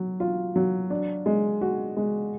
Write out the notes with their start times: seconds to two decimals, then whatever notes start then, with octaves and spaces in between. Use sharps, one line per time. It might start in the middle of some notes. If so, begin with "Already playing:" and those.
Already playing: F#3
0.20 F4
0.56 F#3
0.90 D4
1.26 G#3
1.61 F#4
1.97 G#3